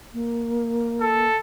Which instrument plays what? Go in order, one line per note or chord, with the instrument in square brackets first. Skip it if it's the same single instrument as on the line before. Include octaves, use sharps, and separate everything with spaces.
[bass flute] A#3
[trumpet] A4